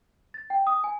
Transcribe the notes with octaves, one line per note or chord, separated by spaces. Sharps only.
A6
G5
D#6
G#5